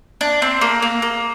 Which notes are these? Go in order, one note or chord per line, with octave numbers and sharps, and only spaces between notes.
D4
C4
A#3
A#3
A#3